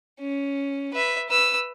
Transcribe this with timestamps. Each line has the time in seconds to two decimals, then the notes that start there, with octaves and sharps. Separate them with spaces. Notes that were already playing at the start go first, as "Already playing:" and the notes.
0.20 C#4
0.94 B4 E5
1.29 B4 E6